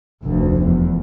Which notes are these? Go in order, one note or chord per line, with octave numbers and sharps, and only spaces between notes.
F1 D2
E2